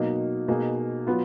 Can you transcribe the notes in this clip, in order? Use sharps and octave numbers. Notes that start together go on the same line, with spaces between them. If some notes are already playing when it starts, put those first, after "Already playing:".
Already playing: B2 F#3 A#3 D#4
B2 A#3 D#4 G#4
F#3 B3 F4